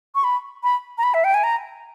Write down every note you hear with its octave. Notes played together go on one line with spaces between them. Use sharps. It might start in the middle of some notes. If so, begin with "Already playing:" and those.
C#6
B5
B5
A#5
B5
E5
G5
G#5
A#5